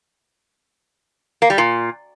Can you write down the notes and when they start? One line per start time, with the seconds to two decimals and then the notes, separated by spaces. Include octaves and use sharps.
1.42 A#3
1.50 G3
1.58 A#2